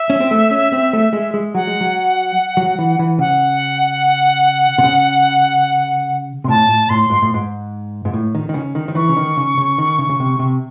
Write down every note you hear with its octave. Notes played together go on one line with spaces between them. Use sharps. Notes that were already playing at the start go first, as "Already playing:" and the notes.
Already playing: E5
C#4
C4
A3
C#4
C4
A3
G#3
G#3
F#3 F#5
G#3
F#3
F#3
E3
E3
C#3 F#5
C3
C#3
C3 C6
A2 A5
A2
A2 C6
G#2
A2
G#2
G#2
A2
D#3
D#3
C#3
D#3
D#3
E3 C#6
C#3
D#3
C#3
C#3
D#3
C#3
C#3
C3
C3